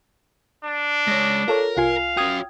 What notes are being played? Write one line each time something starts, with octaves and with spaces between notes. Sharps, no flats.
D4
G#3 C#5 A#6
F4 A4 A#4 C#5
C2 F4 F5 G#5
C#4 F#4 G5 D#6 G#6